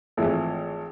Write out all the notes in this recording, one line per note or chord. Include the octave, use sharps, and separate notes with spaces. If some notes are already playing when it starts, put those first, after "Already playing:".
G#1 E3 F3 A3